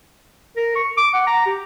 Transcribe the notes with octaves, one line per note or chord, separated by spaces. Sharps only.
A#4
C#6
D6
F#5
A#5
G4